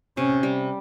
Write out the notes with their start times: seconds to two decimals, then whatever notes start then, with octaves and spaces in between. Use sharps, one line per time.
0.17 C3 C#4
0.43 G3